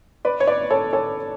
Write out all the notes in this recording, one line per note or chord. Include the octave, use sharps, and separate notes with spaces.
B4 D5
C#5
B4 D5
A4 C#5
A4 C#5